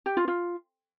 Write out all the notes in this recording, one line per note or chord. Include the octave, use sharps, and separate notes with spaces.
G4
F4
F4